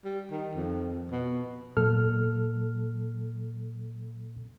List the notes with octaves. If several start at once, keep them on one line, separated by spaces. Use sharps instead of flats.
G3
D#3
F2
B2
A#2 F#3 A#3 A4 F6